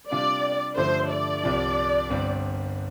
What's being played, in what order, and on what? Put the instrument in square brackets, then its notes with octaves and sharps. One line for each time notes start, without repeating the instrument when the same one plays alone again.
[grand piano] C3 G3 D4 F4 [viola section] D5
[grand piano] G2 D3 F3 A3 [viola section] C5
[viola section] D5
[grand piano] C2 C3 F3
G1 G2 G3 C4